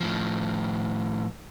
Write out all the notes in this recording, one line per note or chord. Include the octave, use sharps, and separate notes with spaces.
A2 F3